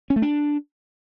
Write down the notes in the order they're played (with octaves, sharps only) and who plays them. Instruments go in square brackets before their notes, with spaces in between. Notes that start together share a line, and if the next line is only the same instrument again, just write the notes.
[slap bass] C#4
A3
D4